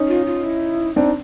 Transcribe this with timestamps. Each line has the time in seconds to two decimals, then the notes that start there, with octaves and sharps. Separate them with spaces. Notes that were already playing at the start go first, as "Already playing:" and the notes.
Already playing: C#4 D#4
0.08 F4
0.26 F4
0.44 E4
0.96 C4 D4 D#4